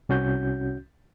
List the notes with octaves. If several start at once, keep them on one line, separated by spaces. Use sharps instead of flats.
C2 C#4 F#4 G6